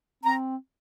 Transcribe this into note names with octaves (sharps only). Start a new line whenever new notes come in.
C4 A#5